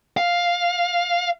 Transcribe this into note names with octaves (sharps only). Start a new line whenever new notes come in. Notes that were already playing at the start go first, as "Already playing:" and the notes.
F5